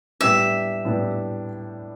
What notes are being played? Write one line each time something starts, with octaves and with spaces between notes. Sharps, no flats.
A2 G3 B3 D4 G4 E5
A2 G3 B3 D4 G4